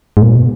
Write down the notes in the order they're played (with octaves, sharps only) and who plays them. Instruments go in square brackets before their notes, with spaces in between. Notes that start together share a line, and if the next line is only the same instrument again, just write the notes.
[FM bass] G#2
A#2
B2